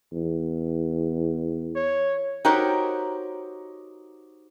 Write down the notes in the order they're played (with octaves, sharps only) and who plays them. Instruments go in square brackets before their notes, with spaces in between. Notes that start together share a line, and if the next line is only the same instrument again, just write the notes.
[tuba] E2
[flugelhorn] C#5
[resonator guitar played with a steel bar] D#4 F#4 G4 A#4 C5 C#5